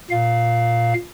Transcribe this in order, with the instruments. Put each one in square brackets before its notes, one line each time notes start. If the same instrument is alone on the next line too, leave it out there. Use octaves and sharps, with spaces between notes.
[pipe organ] A#2 F5